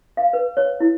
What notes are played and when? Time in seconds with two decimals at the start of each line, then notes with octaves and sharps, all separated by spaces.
0.17 F5
0.33 B4
0.57 C#5
0.80 E4